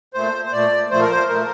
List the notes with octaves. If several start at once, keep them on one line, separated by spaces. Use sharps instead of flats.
A#2 A3 C5
C5
A#2 A3 D5
A#2 F3 A3 C5
A#4
C5
A#2 F3 A3 A#4